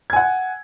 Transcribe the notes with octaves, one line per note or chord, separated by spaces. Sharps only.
F#5 G#5 G#6